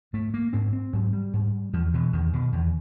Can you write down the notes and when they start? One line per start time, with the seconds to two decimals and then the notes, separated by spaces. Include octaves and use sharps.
0.13 G#2 A3
0.34 A#3
0.53 G#2 C4
0.73 C4
0.93 G#2 F#3
1.13 G3
1.33 G#2
1.73 E2 F3
1.94 B2 E3
2.13 E2 D#3
2.33 B2
2.53 E2